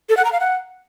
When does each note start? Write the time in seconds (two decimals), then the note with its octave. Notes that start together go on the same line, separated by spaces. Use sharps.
0.09 A4
0.17 F#5
0.25 A#5
0.32 F5
0.40 F#5